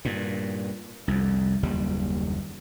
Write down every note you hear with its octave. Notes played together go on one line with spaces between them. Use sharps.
G2 A#2
C2 F2
F#1 D#2 G3